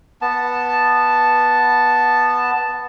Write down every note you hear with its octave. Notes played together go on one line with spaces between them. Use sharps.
B3 A5